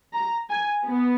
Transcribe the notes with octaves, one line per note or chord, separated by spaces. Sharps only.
A#5
G#5
B3